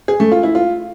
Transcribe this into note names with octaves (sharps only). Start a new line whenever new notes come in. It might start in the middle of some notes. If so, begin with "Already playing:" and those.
G#4
A3
F4
E4
F4